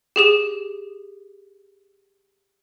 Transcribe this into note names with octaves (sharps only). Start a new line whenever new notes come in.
G4 G#4 E7